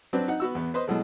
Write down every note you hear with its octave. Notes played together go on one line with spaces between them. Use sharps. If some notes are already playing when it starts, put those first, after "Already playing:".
F#3 C4 D4 B4
D#4 F#5
B3 F#4 E6
E2 B3
B4 C5 D#5
B2 E3 F#3 G#3 A3